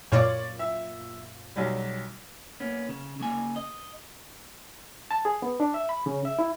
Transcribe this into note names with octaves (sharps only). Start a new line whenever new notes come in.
F#2 A#2 F4 C#5 D5 D6
E5
B1 F#3 G3
A#3 B3 C#4
C#3
C#3 A#3 G#5
D#5
A5
G#4
B3
D4
E5
B5
C#3
E5
E4